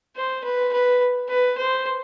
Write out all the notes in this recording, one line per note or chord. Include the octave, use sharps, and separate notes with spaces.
C5
B4
B4
B4
C5